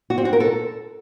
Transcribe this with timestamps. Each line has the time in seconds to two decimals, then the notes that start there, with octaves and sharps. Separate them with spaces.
0.10 F#4
0.18 C4
0.25 F#4
0.33 A#4
0.40 A4